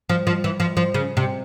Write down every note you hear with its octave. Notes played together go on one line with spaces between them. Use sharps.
F3
F3
E3
F3
F3
C#3
C3